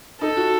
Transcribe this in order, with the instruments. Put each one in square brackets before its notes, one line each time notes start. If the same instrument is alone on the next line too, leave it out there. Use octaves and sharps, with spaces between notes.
[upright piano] D#4 [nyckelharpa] A4
[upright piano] F#4